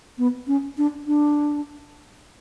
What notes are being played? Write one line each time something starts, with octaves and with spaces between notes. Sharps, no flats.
B3
C#4
D4
D4